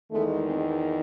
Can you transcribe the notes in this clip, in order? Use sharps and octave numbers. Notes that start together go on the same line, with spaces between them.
E2 D#3 G#3 A3
G#3 C4